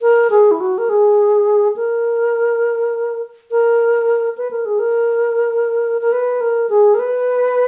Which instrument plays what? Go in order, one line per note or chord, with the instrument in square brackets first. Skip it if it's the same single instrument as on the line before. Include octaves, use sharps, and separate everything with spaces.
[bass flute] A#4
G#4
E4
F#4
A#4
G#4
A#4
A#4
B4
A#4
G#4
A#4
A#4
B4
A#4
G#4
A#4
B4